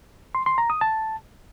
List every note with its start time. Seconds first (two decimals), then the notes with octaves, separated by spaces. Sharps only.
0.35 C6
0.46 C6
0.58 A#5
0.70 D#6
0.81 A5